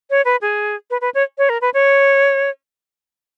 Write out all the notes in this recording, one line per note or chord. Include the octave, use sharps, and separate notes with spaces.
C#5
B4
G#4
B4
B4
C#5
C#5
A#4
B4
C#5